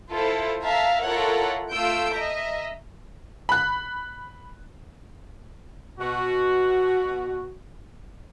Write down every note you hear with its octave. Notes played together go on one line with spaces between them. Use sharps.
E4 F4 A4 C5
E5 F5 A5 A#5
E4 F4 A4 A#4 C#5 F#5
A3 F4 E6 G6 D7
D#5 E5 A#5
B5 F#6
B2 F#4